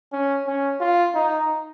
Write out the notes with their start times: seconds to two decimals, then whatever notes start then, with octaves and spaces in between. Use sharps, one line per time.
0.12 C#4
0.47 C#4
0.80 F4
1.15 D#4